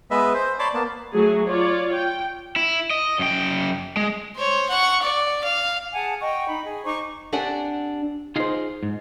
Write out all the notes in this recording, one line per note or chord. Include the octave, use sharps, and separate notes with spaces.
G#3 B3 B4 D#5 E5
C5
C#5 D5 A5 B5 C6 D6
A#3 B3 A5
F#3 A3 G#4
F4 C#5 D5
G5
E4
D#5
F#2 G5
G#3
C5 C#5
F#5 C#6
D5
F5
G#4 F#5 G#5 A5
D#5 F#5 G5 C#6
D#4 B5
G#4
D#4 C5 C#6 D6
C4 D4 G4 D5 F#5 G#5
D#4 F4 G#4 C5 F5
G#2